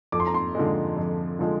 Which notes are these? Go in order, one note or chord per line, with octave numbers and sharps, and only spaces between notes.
F2 D6
C6
A#5
C6
D3 F3 G#3
F2
D3 F3 G#3